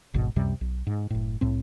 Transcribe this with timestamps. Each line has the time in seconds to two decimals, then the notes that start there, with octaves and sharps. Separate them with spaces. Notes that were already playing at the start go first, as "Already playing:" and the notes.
0.14 D1 G#1 G#2 B2
0.36 C#2 F#2 C3 G3
0.61 B1
0.87 G#2
1.10 F#1 A2
1.41 C2 A2 C4